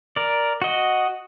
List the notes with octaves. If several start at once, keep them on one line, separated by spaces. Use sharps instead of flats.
A#4 D5
F#4 D#5